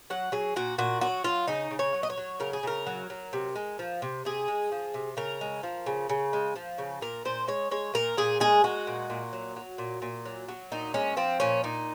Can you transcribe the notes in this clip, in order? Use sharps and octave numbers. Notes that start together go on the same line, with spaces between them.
F#3 F#5
F#3 G#4
A#2 F#4
A#2 F#4
F#3 F#4
F#3 F4
C#3 D#4
C#3
C#5
F#3
D#5
C#5
F#3
C#3 A#4
G#4
C#3 A#4
F#3
F#3
C3
G#3
F3
C3
C3 G#4
G#3
F3
C3
C#3 A#4
G#3
F3
C#3
C#3
G#3
F3
C#3
A#2 A#4
A#2 C5
G#3 C#5
G#3 C#5
A#2 A#4
A#2 G#4
G#3 G#4
G#3 F#4
A#2
A#2
F#3
F#3
A#2
A#2
F#3
F#3
A#2 D#4
G#3 C#4
F3 C4
A#2 C#4
A#2 D#4